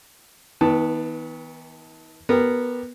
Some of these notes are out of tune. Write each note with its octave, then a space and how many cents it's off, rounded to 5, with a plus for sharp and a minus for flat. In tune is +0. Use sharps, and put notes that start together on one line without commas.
D#3 +45 B3 -10 A5 +0
B3 -10 G4 +0 A#4 -15